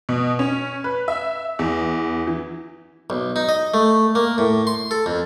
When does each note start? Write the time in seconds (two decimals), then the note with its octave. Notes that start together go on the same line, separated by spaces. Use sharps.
0.09 B2
0.39 C#4
0.84 B4
1.08 E5
1.59 E2
2.27 E3
3.10 B1
3.36 D#4
3.49 D#5
3.74 A3
4.15 A#3
4.38 A2
4.67 C6
4.91 A4
5.06 F2